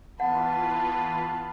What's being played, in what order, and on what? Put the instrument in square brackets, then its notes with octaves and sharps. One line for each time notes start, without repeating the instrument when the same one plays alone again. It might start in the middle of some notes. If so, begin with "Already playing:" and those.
[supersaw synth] E3 F4 B4 [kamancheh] B3 A5 [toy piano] F#5